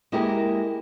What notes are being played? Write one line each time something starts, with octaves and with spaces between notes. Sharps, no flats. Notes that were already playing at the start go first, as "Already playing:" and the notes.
G#3 A#3 E4 G4 G#4 A#4